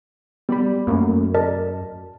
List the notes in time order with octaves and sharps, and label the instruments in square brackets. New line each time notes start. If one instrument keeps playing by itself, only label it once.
[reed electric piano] G3 D5 B5 [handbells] B3
[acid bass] F#2 [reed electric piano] A3 A#3 C#4
[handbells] A#4 D5 D#5 [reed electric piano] A5